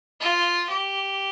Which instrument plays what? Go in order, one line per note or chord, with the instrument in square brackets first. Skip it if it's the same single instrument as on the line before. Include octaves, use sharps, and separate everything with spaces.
[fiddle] F4
G4